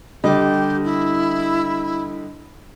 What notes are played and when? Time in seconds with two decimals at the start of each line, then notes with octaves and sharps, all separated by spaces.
0.24 D3 G3 G4 D#5
0.84 E4